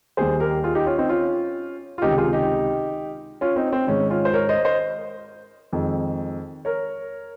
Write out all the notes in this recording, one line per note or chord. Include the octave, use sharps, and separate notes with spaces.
D#2 D#3 G3 G#4 C5
G4 A#4
F4 G#4
D#4 G4
C#4 F4
C4 D#4
C#4 F4
F4
C#2 C3 D#3 D#4 G4
F4 G#4
D#4 G4
C#4 F4
C4 D#4
C4
G#2 D#3 G#3 C#4
C#4 F4
C5
A#4 C#5
C5 D#5
C5 D#5
F2 D#3 G#3
A#4 C#5